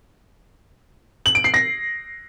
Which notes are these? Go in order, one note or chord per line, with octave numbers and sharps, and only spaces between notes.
F#7
D7
C7
A#6